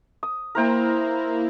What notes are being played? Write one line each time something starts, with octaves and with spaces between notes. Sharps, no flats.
D#6
A#3 E4 A#4 C5 G5 A#5